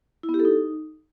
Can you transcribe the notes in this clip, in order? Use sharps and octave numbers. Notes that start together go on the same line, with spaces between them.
E4
B3
G4
A4
D#4